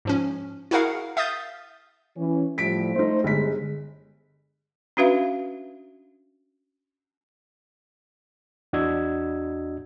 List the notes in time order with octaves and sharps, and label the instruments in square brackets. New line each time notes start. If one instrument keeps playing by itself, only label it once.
[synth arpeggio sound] G#2 F3 C#4
E4 F#4 G#4 A#4 F5 F#5
E5 F5 D#6 G6 A6
[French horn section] E3 C#4
[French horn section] A2 F3 G3 [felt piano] B6 D7
[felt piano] A3 D#4 [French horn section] C5
[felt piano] G1 B6 [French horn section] G#3
[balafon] C#4 D4 F#4 B4 E5 F5
[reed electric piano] E2 D4 F#4 D#5 E6 G#6